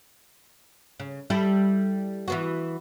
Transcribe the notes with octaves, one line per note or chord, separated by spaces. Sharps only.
C#3
G3 E4 A4
E3 B3 F#4